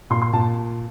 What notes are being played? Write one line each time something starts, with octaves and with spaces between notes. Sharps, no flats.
A#2 C6
C6
A#2 A5